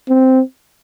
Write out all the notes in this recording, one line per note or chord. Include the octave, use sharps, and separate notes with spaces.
C4